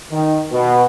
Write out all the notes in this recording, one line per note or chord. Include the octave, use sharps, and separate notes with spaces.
D#3
B2